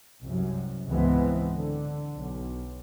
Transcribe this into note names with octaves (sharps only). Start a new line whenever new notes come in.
C2 F#2
C#2 G#2 E3 G#3 B3 C4
D3
B1